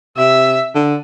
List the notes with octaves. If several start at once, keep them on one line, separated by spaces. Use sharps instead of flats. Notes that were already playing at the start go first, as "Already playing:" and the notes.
C3 E5
D3